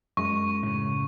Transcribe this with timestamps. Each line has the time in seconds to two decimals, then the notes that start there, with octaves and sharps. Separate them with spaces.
0.17 F#2 G#3 C#6
0.63 A2 C#3